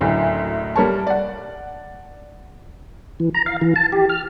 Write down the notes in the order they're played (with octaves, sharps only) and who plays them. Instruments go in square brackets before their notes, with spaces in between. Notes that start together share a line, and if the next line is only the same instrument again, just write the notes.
[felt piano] F#1 D2 A2
G3 A#4 C#5 A5
D5 F#5
[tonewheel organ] E3
A#5
F5
E3
A5
G4
F6